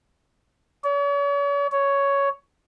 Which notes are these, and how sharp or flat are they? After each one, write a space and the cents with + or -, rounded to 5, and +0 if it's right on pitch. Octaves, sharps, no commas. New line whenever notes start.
C#5 +40
C#5 +5